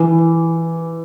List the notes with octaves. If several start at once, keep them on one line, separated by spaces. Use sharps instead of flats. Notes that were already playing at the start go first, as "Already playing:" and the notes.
Already playing: E3